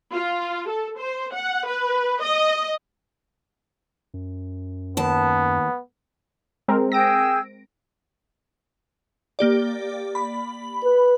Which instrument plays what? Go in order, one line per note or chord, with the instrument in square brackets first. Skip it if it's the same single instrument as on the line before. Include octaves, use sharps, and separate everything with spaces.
[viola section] F4
A4
C5
F#5
B4
D#5
[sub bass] F#2
[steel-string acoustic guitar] D#2 A5 [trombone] B3
[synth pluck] G#3 C4 A#4
[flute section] G#4 G5 E6 [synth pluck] A#6 D7
[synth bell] A#3 G4 D5
B5
[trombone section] B4